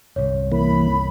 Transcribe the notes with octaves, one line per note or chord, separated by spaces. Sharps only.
G1 C2 C#5
E3 A#3 B5